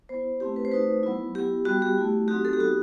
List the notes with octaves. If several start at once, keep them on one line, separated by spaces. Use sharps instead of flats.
B3 E4 C5
A3 C4 E4 G4
B4
C5
A3 D#4 F#4 B4
F#3 B3 E4
B3 E4 G4
G3 B3 F#4
G4
A3 E4
F#3 C4 D#4 F#4 G4
A4
G4
B3 D#4 F#4